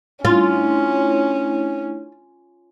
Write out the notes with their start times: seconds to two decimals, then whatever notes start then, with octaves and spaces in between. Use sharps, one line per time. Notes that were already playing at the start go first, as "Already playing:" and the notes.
0.25 A3 C#4 D4 E4 F4